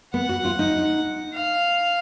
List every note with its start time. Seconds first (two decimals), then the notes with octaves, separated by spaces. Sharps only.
0.14 B3 F#5
0.29 F#4
0.45 F4
0.59 D#4
1.34 F5